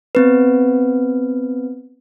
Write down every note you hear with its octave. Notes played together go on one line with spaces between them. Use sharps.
B3 C4 B4